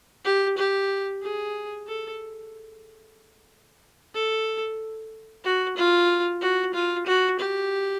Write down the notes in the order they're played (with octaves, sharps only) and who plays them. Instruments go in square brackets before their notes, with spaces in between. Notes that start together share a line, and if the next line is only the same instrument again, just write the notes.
[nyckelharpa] G4
G4
G#4
A4
A4
F#4
F4
F#4
F4
F#4
G4